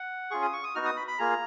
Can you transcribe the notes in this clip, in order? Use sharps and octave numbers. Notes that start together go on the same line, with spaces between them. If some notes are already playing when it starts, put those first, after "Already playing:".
Already playing: F#5
C#4 F4 G#4 C#6
D#6
C#6
D#6
B3 D#4 F#4 F6
D#6
B5
B5
A#3 F4 G#4 A#5